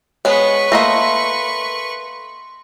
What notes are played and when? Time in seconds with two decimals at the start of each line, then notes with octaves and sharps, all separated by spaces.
0.25 G#3 B3 B4 C#5 C#6
0.72 A3 A#3 D#5 C6 A#6